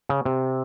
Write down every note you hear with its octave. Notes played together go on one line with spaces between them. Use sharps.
C#3
C3